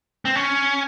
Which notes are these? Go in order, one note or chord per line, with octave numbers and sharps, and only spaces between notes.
C4
C#4